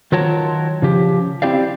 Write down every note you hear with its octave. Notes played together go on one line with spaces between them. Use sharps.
D#3 F#3 F4 A#4 C#5 A5
C#3 F3 G4
C4 E4 G4 D5 F5